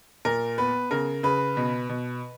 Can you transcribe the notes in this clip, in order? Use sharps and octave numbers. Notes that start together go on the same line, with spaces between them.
A#2 A#4
B3 B4
C#3 A#4
C#3 B4
B2
B2